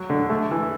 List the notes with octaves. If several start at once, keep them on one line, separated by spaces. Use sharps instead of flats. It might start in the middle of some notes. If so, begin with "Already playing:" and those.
Already playing: F#3
D3
A3
E3